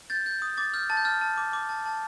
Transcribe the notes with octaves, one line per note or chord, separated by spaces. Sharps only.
G6 A6
G6
D#6
D6 A6
F6 G6
A5 A6
G6
F6 A6
A5
D6
D6
A5
A5